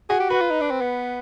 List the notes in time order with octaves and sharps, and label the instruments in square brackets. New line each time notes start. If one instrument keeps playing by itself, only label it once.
[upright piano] F#4 [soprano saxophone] G#4
[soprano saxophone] G4
[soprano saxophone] F#4 [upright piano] B4
[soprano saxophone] F4
D#4
D4
C4
B3